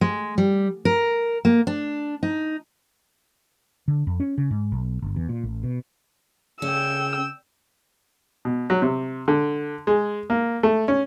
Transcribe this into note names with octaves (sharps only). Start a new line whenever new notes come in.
G#3
G3
A#4
A#3
D4
D#4
D3
F2
C#4
C#3
G#2
B1
G1
E2
A#2
A1
B2
C#3 C#4 G5 E6
B2
F#3
C3
D3
G#3
A#3
A3
C#4